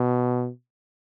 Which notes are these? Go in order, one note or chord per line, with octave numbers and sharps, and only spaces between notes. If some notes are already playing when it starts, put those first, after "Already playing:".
Already playing: B2